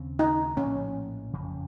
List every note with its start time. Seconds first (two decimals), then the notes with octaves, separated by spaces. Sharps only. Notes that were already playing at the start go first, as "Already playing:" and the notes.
Already playing: D#2 C#3 C4
0.19 D#4
0.57 A#1 A2 F3 A#3 C#4
1.33 F#1 F2 C#3 F3